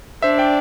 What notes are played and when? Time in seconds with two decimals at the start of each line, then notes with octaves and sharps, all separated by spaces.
0.22 D4 C5 E5
0.38 D5 G5